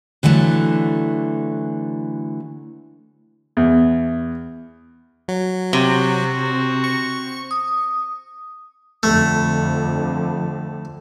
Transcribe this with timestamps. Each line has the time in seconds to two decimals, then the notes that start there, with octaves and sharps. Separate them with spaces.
0.23 D3 E3 F#3 A3
3.57 E2
5.28 F#3
5.73 C3 C4 F#4
6.84 C#6
7.51 D#6
9.03 F2 D3 A3